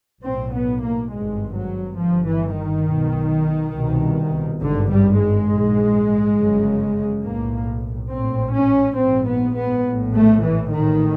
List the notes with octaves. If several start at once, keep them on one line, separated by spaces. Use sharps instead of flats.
B1 A2 C4
B3
A#3
G#1 G2 G#3
F#3
G1 G2 F3
E3
D#3
B1 B2
C2 B2
G#1 G2 D3
G3
G#3
A#1 G#2
G1 F#2 C#3
B1 A2 A#3
A#1 A2 C4
C#4
A#1 G#2 C4
B3
B3
A#1 A2
A3
E3
A1 A2 D#3